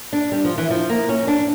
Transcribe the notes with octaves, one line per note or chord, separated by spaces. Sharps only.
D4
G3
F3
E3
F3
A#3
C#4
D4